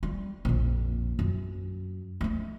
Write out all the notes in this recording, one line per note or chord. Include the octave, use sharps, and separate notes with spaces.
G3
A#1 F2
F#2
A3 D#4